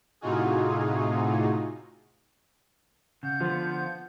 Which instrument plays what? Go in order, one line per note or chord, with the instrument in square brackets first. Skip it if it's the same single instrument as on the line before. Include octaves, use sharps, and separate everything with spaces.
[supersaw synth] A2 C3 D#4 F4 F#4 G#4
[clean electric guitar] C#3 [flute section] F#5 G6
[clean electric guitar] D3 B3 [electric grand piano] F3 F4